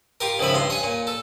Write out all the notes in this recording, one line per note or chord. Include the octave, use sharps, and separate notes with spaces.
F4 G4 A#4
C#2 D#3 F3 E5 B5
G2 C6
C#5 G#5
A#2
A4